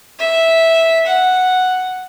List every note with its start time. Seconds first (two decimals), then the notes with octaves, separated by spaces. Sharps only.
0.19 E5
1.07 F#5